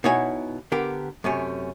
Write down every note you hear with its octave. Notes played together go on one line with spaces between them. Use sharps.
B2 D#4 E4 C#5 F#5 G#5
D3 B3 G4 A#4
F#2 C3 A3 C#4